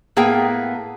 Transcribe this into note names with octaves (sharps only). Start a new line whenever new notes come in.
A2 A#3 B3 G#4 G5